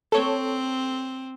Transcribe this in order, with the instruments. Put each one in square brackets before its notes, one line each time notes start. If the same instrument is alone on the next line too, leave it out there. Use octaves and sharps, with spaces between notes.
[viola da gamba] C4 [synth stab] A4 C#5